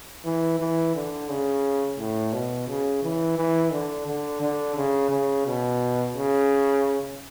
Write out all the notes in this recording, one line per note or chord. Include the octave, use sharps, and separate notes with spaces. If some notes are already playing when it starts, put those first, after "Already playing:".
E3
E3
D3
C#3
A2
B2
C#3
E3
E3
D3
D3
D3
C#3
C#3
B2
C#3